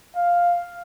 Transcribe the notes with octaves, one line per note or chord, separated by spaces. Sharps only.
F5